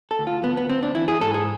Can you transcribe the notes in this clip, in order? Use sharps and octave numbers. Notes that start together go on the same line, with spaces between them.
A4
D2
F4
D2 B3
B3
D2 C4
D4
E3 E4
G#4
G#2 A4
G#4